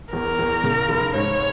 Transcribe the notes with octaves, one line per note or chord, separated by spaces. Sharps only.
E2 A#4
E2
C#3
F1
G#2 C#5